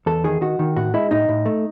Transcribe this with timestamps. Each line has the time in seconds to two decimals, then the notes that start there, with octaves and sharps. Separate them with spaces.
0.06 E2 A4
0.24 D#3 G#4
0.41 D#3 F#4
0.59 D#3
0.76 A2 F#4
0.94 G#3 E4
1.11 A2 D#4
1.29 A2
1.46 A3